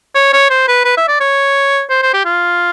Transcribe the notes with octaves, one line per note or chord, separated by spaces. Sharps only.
C#5
C#5
C5
B4
B4
E5
D5
C#5
C5
C5
G4
F4